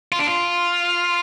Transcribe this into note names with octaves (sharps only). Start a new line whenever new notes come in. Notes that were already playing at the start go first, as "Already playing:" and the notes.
F4
D4
F4